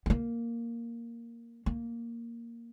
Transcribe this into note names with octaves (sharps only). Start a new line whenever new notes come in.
B3
A#3
A#3